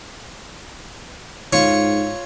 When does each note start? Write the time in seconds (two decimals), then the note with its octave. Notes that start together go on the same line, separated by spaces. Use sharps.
1.53 G#2 F4 C#5 C#6